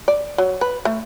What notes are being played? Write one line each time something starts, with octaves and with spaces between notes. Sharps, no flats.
D5
F#3
B4
A3